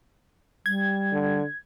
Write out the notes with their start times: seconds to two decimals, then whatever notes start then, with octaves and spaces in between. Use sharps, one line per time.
0.66 G3 G#6
1.12 D3